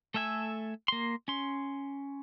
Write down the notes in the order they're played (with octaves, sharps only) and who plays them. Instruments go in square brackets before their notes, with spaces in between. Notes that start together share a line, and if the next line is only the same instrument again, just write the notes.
[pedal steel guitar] A3 A4 E5 G#5 E6
A#3 C6
C#4 C6